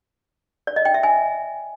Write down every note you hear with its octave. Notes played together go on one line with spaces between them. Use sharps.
D5
D#5
G5
E5
G#5